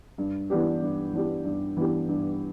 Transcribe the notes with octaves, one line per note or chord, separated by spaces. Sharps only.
G2
E3 B3 D4 G4
G2
E3 B3 D4 G4
G2
E3 B3 D4 G4
G2